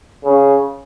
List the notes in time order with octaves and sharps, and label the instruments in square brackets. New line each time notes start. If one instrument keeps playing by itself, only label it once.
[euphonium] C#3